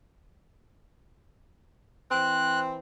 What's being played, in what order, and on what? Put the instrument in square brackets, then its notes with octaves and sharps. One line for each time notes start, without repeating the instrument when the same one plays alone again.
[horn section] E3 C4 [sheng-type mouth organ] F#6